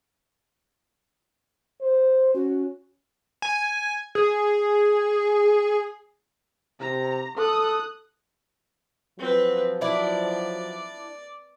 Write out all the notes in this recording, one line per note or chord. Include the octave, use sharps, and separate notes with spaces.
C5
C#4 F#4
G#5
G#4
C3 A#5
A4 D#6 F#6
F3 F#3 C4 B4
D4 E4 D5